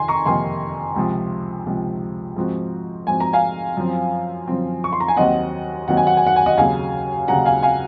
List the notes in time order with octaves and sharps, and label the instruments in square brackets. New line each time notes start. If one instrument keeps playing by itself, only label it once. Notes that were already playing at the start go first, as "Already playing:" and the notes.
Already playing: [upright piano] F2 C3 D#3 [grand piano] G#5 C6
[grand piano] A#5 C#6
[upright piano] F2 C3 D#3 A#3 [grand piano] G#5 C6
[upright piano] C#2 C3 F3
C#2 C3 F3
G#2 F3 C4 F#4
[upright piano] G#2 F3 C4 F#4 [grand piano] G#5
[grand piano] A#5
F5 G#5
[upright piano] F#2 F3 C4
F#2 F3 C4
[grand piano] C#6
C6
A#5
G#5
[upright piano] D#2 D#3 F#3 C4 [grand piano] D#5 F#5
[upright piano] D#2 D#3 F#3 C4 [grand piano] F#5
[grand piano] G#5
F#5
G#5
F#5
G#5
D#5 F#5
[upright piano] D#2 C#3 F#3 [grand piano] F5 G#5
[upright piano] D#2 C#3 F#3 [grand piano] F#5 A#5
[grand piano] F5 G#5
F5 G#5